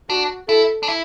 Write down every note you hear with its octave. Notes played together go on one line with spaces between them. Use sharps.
D4 F#4
E4 A4
D4
E4